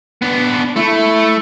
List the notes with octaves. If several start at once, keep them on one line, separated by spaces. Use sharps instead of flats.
B3 D4
A3 E4